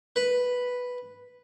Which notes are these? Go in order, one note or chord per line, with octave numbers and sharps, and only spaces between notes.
B4